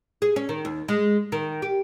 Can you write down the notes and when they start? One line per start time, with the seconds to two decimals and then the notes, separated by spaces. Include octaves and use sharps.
0.22 G#4
0.36 C#4
0.49 D#3
0.65 D#2
0.88 G#3
1.32 D#3
1.62 G4